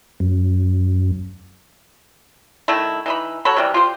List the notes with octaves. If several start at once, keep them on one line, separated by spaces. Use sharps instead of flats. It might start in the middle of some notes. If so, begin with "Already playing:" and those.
F#2
D#3 A3 E4
E3 D#4 B5
F#3 A4 C#5 B5
C3 E3 G3
F4 G4 C5